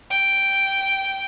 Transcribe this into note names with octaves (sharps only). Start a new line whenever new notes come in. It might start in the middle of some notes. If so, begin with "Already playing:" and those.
G5